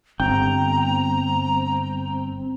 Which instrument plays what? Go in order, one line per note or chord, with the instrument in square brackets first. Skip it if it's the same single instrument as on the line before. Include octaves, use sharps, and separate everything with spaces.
[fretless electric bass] G1 [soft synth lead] C4 [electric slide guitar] G5 [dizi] A#5